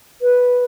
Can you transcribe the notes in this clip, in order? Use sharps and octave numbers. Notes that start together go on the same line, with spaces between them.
B4